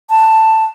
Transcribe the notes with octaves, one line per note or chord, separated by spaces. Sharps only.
A5